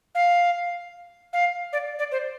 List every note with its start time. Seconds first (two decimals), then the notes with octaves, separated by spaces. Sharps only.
0.15 F5
1.33 F5
1.73 D5
1.99 D5
2.12 C5